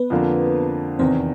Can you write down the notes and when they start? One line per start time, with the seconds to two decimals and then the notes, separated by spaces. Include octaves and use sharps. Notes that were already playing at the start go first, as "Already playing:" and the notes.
Already playing: B3 B4
0.10 F2 D3 F3 A#3
0.99 E2 C3 D#3 C4 C5